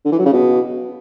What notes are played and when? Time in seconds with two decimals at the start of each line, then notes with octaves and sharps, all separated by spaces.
0.05 D3
0.12 E3
0.19 F#3
0.26 C#3
0.32 B2